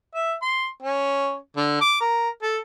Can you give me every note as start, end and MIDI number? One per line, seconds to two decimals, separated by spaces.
0.14 0.34 76
0.42 0.67 84
0.82 1.36 61
1.56 1.78 50
1.81 1.95 86
2.00 2.29 70
2.42 2.57 69